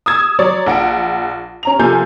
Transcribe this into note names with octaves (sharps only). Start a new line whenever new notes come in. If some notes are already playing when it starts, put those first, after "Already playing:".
D#6 E6 G#6
F#3 C#5 D5
A#1 F#5 D7
C#4 A#5 F7
C3 F3 A#3 A4 G#5 G6